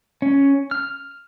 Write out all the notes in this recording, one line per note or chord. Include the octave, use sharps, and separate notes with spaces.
C#4
F6